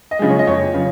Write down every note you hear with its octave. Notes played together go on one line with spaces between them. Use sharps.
D#5
C#3 F3 G#3
C#5
D#5
F2 C#5
C#3 F3